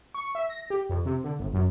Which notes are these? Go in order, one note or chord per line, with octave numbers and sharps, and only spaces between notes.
C#6
E5
A#6
G4
F2
C3
D3
G1
F#2